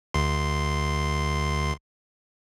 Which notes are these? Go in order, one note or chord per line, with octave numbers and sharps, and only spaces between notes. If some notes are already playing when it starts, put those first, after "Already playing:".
D2 C6